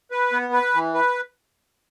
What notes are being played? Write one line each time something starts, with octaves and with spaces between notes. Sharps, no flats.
B4
B3
B4
E3
B4